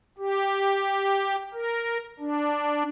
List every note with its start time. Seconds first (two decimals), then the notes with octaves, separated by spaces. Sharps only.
0.18 G4
1.53 A#4
2.19 D4